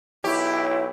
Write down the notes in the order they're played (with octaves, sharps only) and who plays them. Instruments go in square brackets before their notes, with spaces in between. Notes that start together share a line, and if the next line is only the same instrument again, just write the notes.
[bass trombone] B1 [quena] E4 [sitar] G4 [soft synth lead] C#5